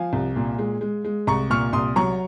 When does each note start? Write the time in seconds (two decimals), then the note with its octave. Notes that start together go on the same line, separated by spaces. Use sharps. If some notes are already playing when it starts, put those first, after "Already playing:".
Already playing: F3 F5 G#5
0.13 C2
0.36 A#2
0.58 G#3
0.81 G#3
1.05 G#3
1.27 C2 A#5 C#6
1.50 A#2 C#6 F6
1.73 C2 C6 D#6
1.96 F#3 A#5 C#6